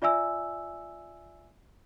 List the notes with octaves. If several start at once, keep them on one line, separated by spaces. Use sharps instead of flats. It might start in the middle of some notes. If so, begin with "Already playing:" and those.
F4 D5 E5 G#5 E6